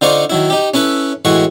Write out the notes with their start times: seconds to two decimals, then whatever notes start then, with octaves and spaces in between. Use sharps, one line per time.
0.01 D3 D#4 F4 C5 D5 C#6
0.30 D#3 F#3 E4
0.50 D#4 G4
0.74 C#4 E4 A4 B4
1.25 A2 E3 G#3 F#4 C#6